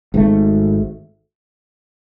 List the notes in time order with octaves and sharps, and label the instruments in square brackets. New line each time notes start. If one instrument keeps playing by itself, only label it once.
[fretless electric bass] G#1 G#2 D#3 A3